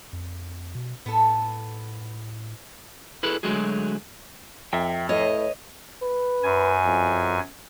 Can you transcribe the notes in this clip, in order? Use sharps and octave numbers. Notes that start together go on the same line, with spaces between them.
F2
B2
A2 B3 A4
E4 G#4 A4 B4
D3 F#3 G#3 A3 F#4 G#4
F2 E5 G5
A2 B4 C#5 D#5
B4
F#2 G#5
F2